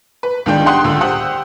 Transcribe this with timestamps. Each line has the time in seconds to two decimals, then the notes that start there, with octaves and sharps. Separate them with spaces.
0.23 B4
0.46 C#2 D#3 G#3 D4 G5
0.66 G4 F#5 C6 D#6 F#6
0.84 C#2 D3 E6
1.01 G4 C5 F#5 D#6